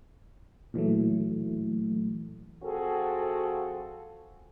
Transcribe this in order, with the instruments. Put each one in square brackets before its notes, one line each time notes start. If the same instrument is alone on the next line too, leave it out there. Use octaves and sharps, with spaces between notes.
[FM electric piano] A#2 E3 F#3 A3
[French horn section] F3 C4 F#4 G#4 A4